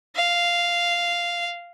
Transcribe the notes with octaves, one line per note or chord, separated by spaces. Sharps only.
F5